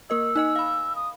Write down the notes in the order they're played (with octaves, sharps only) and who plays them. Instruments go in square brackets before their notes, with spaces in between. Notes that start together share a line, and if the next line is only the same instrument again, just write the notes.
[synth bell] A#3 A#4 D#5 [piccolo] E6
[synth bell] D#4 D#5 G#5
F5 B5
[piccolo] D#6